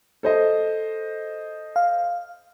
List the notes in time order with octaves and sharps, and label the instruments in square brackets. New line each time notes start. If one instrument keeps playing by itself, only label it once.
[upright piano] A4 C5 D#5
[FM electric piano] F5